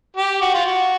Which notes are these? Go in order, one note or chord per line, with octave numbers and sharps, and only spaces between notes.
G4
F#4
F4
F#4